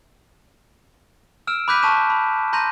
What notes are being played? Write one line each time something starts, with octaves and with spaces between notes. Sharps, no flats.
E6 F6 D7 E7
B5 D6 F#6 G6 B6 D#7
A5 C#6 B6 D#7 E7
B5
A#5 C6 G6 A#6 D#7 F7